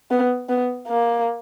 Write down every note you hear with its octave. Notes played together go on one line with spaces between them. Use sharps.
B3
B3
A#3